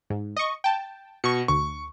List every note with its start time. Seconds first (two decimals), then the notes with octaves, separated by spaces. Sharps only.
0.10 G#2
0.36 D#5 C#6
0.64 G5 A5
1.24 B2 C#6 C#7
1.48 D2 C#6